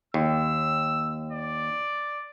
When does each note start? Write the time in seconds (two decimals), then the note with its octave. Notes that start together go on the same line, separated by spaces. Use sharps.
0.14 D#2 E6
1.32 D5